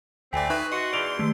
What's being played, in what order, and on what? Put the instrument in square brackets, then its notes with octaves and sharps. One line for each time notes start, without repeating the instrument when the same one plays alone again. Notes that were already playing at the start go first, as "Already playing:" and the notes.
[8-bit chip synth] D2 D5 [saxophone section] E3 A3 C4 [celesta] G5 G#5 [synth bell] B6
[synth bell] D#4 E5 C#6 [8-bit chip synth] B4 G#5 B5 [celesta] F#6
[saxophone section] F#4 [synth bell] D#5 C#6 C#7 [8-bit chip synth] C6
[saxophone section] E2 [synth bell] D5 G7 [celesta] D7 F7
[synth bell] D#3 A3 G4